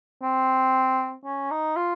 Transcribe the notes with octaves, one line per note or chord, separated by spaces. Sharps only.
C4
C#4
D#4
F4